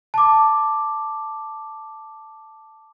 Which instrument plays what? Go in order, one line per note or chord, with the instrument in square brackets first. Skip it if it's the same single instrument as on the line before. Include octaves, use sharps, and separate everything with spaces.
[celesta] A5 D6